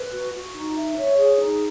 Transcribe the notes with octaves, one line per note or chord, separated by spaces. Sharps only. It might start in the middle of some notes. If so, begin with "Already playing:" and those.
Already playing: B4
F#4
F#4
D#4
E5
C#5
G#4
D#4